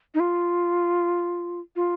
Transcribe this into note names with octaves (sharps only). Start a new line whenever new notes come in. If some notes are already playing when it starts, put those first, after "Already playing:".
D#4
F4
F4